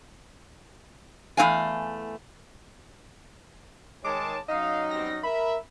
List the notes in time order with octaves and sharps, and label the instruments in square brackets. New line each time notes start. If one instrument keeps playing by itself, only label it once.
[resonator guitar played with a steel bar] E2 A3 C4 C#5 F5 G#5
[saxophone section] D#3 G#3 [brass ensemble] C#5 G#5 A5 [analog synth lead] D6
[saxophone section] F#3 C#4 D#4 [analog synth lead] D#5 [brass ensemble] F5
[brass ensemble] B2 G3 C4 [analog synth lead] A#6
[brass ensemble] A#4 E5 [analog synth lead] B5